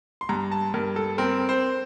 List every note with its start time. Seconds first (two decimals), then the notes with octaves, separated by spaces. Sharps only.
0.21 C6
0.29 G2 A#5
0.52 A5
0.74 G2 A#4
0.96 A4
1.18 C4 A#4
1.49 C5